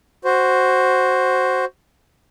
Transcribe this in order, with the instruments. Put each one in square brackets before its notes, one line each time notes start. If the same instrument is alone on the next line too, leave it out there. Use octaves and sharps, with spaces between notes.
[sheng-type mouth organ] F#4 C5